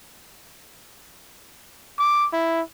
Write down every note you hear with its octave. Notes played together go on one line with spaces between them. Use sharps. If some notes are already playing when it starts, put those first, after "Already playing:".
D6
E4